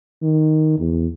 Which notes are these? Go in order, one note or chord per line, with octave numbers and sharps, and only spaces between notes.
D#3
E2